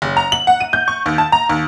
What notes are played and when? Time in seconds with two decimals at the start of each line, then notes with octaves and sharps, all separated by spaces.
0.02 F#1
0.17 A#5
0.32 F#7
0.47 F#5
0.60 D#7
0.73 G6
0.88 C#6
1.06 D#2
1.18 A5
1.32 A#5
1.49 D#2